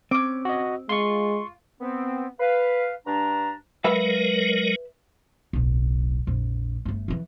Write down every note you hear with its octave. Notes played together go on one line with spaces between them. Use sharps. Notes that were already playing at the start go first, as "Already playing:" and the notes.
C4 C#4 D6
F#4 D#5
G#3 F4 C6 C#6
B3 C4
B4 F5
G2 D4 A#5
F#3 G#3 A#4 B4 E5 F5
D1 B1
A#1 F2
G1 A3
E2 E3